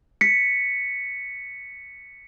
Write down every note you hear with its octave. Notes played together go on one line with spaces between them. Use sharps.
B6 C#7